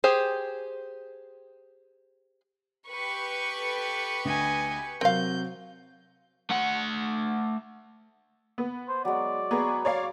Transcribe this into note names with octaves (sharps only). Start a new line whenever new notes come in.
G4 G#4 C5
G4 B4 C#6
A4
D2 D#5 G#5
C3 F#3 C4 A#4 F5 G6
A3 F#5
B3
C5
F#3 G#3 D5
B3 G#4 A#5 B5 C#6
C#5 D5 F5